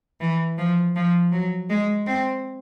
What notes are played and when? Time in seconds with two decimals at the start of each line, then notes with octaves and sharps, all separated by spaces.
0.21 E3
0.58 F3
0.96 F3
1.32 F#3
1.70 G#3
2.07 C4